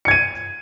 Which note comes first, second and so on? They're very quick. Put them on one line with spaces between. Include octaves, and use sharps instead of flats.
C#7 G#6 D#7